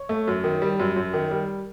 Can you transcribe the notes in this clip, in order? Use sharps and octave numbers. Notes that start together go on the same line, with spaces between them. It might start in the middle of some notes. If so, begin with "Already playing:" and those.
Already playing: C#5
A3
F#2
D#3
G3
F#2
F#2
D#3
G3